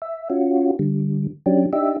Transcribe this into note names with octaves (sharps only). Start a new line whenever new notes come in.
E5
C#4 F4 F#4
D3 G3
F#3 C#4 D4 G4
D4 D#4 G4 E5